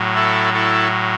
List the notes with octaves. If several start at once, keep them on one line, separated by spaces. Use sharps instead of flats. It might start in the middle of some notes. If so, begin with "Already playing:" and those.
Already playing: A2 F#3
E4 A4
E4 A4